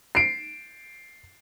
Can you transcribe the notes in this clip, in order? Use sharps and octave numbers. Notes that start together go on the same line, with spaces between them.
C7 D7